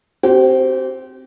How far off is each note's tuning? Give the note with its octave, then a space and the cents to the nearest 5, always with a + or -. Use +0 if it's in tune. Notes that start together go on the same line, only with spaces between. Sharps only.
C4 +0 G4 -35